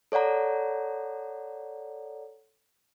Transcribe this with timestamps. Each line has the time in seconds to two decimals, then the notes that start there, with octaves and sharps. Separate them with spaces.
0.12 A4 C#5 D5 F#5 A#5